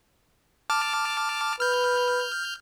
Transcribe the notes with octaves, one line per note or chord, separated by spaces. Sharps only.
A5 D6 F6
B4 F6 G6